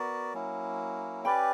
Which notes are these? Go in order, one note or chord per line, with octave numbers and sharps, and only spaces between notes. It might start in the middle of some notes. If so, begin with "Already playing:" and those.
Already playing: B3 F#4 A#4 D5
F#3 A#3 C#4 E4
C#4 G4 B4 D5 G5 B5